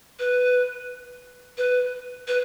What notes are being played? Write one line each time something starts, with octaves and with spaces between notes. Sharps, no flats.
B4
B4
B4